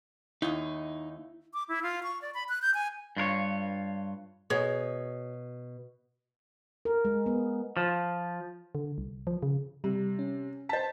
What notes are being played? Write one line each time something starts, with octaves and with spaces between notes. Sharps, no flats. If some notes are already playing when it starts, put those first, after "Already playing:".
D#2 D#4 E4 D#5
D6
E4
F4
C#6
D5
B5
F#6
G6
G#5
G2 F4 A#4 C#5
B2 F#4 G#4 C#5
A#4
G#3
B3
F3
D3
C2
F3
C#3
C3 G3
C#4
C5 A5 A6 B6